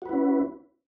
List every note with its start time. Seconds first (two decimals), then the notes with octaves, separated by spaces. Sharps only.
0.02 F#4
0.06 B4
0.09 E4
0.13 C#4